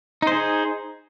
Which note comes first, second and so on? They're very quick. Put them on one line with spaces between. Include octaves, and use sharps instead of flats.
D#4 C5 G#4